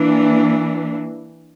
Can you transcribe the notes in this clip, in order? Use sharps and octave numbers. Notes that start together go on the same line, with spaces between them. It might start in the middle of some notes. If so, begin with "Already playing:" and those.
Already playing: E3 A#3 D4